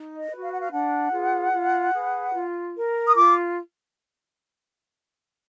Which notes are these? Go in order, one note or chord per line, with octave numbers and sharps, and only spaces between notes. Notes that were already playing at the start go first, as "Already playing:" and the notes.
Already playing: D#4
D#5
F#4 B4
F5
F#5
F5
D4 F#5
F4 G#4 B4
F4
G#4 B4
F4
A#4
D#6
F4 D6